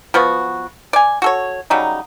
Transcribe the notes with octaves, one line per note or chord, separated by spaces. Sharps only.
F3 B3 F#4
D5 G#5
F#4 A4 C#5
C#3 F#3 G3 D#4